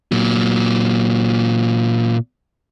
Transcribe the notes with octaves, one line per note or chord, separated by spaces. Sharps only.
A#2 F#3